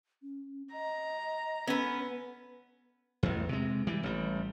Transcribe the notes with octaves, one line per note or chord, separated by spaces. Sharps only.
C#4
D#5 A#5
B3 C#4 B4
A1 E2
C3 G#3
E3 G3
A1 G3